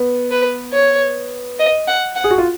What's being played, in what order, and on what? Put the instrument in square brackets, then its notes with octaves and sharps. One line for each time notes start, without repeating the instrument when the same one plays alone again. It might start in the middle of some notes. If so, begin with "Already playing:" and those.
Already playing: [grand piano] B3
[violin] B4
C#5
D#5
F#5
F#5
[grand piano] G#4
F#4
F4